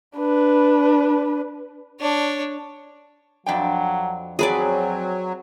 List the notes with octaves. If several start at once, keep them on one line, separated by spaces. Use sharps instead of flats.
D4 B4
D4 C#5
F2 F#3 D4 G5
F#3 C4 G#4 B4 D5